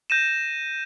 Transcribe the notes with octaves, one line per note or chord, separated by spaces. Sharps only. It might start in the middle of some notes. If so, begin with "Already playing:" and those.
G6 A#6 D#7 E7